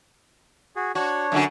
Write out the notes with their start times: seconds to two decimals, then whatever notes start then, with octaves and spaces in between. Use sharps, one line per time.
0.76 F#4 G#4
0.95 D4 F#4 C#5
1.32 F#2 D3 F#4